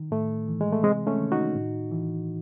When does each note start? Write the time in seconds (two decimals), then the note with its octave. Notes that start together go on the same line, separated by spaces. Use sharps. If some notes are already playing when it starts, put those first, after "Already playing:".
Already playing: D#3
0.11 A2 A3
0.48 E3
0.61 G#3
0.72 A3
0.83 C3 G#3 C4
1.07 A3 C#4
1.19 D#3
1.32 D#4 F#4
1.55 A2
1.91 E3